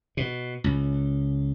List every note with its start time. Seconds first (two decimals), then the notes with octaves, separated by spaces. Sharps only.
0.17 B2
0.64 C#2